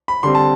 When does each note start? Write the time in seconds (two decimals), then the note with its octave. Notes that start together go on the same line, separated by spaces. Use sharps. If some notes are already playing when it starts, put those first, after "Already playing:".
0.08 B5
0.23 D3 G3 C4 C6
0.35 A5